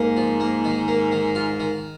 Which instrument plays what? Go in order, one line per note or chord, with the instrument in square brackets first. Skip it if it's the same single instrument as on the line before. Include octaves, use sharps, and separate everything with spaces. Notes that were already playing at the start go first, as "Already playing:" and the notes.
Already playing: [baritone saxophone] G#2 [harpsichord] A#3
[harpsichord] F3
A#3
D#3
A#3
D#3
F4
D#3